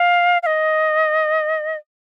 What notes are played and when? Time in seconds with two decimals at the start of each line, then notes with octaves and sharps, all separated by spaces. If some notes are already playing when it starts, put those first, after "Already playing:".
Already playing: F5
0.43 F5
0.46 D#5